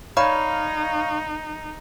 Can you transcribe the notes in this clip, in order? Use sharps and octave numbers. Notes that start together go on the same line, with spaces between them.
D#4 C#5 D5 F5 A#5 B5